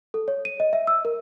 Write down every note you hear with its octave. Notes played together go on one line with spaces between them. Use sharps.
A4
C#5
D#7
D#5
E5
E6
A#4